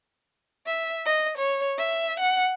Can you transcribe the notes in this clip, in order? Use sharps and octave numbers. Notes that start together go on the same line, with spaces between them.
E5
D#5
C#5
E5
F#5